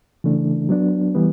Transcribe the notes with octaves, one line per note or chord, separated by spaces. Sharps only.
C#3 E3 A3 D4
F#3 B3 D4
E3 G3 B3